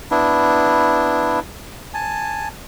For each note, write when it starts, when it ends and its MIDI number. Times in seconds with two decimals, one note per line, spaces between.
0.11 1.40 59
0.11 1.40 62
0.11 1.40 64
1.94 2.48 80
1.94 2.48 81